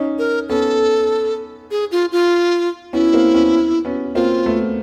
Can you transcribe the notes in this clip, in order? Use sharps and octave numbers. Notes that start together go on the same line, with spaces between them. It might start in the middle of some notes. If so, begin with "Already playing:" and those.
Already playing: C#4 D#4
A#4
B3 C#4 A4
G#4
F4
F4
B3 C#4 E4
A#3 C4
B3 C#4
B3 C#4
A#3 C4 F4
A3 B3